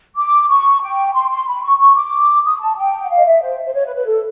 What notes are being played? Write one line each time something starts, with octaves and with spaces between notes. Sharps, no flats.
D6
C#6
G5
C6
C6
B5
C#6
C#6
D6
D#6
A5
G5
F#5
F5
D#5
E5
C5
C5
C#5
B4
B4
A4